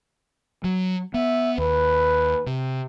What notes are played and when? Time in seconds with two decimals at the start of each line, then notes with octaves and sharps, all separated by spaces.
0.64 F#3
1.14 B3 E5
1.58 D#2 B4
2.47 C3